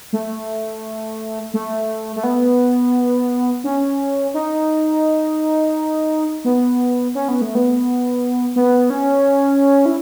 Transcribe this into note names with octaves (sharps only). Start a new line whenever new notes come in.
A3
A3
A3
B3
C#4
D#4
B3
C#4
B3
A3
B3
B3
C#4
E4